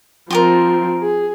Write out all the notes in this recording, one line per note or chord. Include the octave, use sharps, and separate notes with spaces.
F3 C4 F4 G4 A#4
G#4